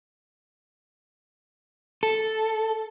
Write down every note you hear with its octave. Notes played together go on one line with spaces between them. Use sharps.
A4